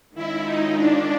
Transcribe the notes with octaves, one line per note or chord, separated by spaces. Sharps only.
D#3 G#3 C#4 E4 F4
D#4
D4